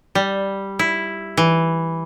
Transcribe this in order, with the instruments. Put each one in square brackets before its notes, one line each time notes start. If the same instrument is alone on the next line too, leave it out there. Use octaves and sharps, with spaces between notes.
[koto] G3
E4
E3